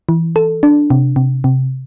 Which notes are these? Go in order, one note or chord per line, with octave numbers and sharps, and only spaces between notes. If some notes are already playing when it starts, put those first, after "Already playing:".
E3
A4
D4
C3
C3
C3